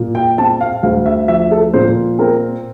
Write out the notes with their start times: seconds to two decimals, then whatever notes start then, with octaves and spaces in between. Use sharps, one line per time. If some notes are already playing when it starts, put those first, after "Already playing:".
Already playing: A#2
0.15 G5
0.38 C4 A5
0.61 F5
0.83 D2 F5
1.06 E5
1.28 F3 E5
1.51 A4
1.74 A#2 C5
2.19 C4 A#4